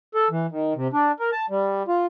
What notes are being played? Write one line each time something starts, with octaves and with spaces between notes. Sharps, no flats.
A4
E3
D#3
C3
D4
A#4
A5
G3
F4